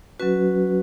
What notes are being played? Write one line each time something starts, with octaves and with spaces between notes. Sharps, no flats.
F#3 C#4 F#4 B4